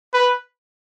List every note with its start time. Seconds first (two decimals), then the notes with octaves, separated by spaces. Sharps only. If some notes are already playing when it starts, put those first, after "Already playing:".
0.14 B4